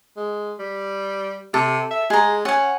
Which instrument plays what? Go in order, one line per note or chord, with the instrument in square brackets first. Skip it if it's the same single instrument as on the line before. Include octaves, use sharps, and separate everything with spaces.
[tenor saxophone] G#3
G3
[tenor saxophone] C3 [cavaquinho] A4
[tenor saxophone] E5
[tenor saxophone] G#3 [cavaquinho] G#4 A#5
[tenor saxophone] C#4 [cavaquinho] F#5 G#5